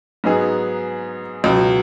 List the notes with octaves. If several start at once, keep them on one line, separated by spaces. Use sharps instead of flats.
G#2 F#3 B3 D#4 G#4
C#2 B2 F#3